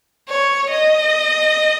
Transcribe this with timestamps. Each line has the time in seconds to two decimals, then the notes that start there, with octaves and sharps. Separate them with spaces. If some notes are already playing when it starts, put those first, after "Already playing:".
0.29 C#5
0.71 D#5